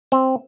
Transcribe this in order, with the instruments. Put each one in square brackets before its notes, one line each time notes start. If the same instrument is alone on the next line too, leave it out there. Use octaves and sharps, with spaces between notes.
[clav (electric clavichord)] C4